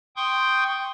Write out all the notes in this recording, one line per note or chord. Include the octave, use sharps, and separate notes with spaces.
G5 C6 C#6 D#6 G6